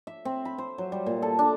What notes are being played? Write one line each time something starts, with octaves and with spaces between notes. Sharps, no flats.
E5
C4
B5
C5
F#3
G3
A#2
A4
D4